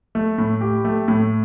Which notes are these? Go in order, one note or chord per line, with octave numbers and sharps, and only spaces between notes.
A3
A2
G4
A3
A2